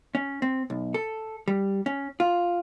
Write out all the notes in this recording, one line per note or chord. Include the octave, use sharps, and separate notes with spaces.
C#4
C4
B1
A4
G3
C#4
F4